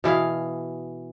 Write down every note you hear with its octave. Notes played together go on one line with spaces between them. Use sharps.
B2 E3 G#4 F5